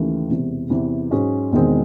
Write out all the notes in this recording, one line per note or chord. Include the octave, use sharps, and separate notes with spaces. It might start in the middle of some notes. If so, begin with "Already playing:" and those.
Already playing: D#2 C#3 E3 A3
E1 E2 C3
E2 C3 E3
G#2 F#3 C#4 G#4
E1 E2 D#3 G#3 C4